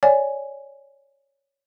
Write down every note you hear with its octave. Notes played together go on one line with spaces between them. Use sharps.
C#5 D5 G#5